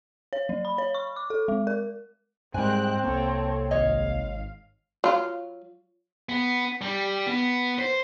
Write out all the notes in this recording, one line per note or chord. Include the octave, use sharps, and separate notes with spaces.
C#5
F#3
B5
C#5
C#6
D6
A4
G#3
A#4
G#2 G3 G#3 C4 A#4 G5 G#5 F#6
C2 A#3 A4 C#5
G#1 C#5 D#5 F5
F#3 F4
B3
G3
B3
C5